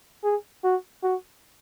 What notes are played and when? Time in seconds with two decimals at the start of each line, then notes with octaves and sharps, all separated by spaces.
0.23 G#4
0.64 F#4
1.03 F#4